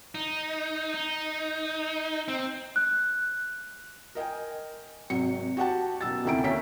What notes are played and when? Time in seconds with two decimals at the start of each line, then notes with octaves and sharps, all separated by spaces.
0.15 D#4
0.94 D#4
2.28 C4
2.76 F#6
4.15 A#4 D#5 G5 G#5
5.10 G#1 C3 F#3 C#7
5.57 F#4 G4 F#5 A5
6.01 F#2 B2 E6 A6
6.25 D2 C3 D#3 E4 G#5 D7
6.44 D#2 C#4 D#4 E5 B6